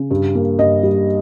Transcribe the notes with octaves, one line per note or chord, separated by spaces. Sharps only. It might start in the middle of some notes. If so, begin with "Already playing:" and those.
Already playing: C#3
G2
A#3
G2 D#5
G3